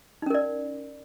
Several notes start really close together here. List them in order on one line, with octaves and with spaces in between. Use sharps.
D#4 C#4 A#4 D5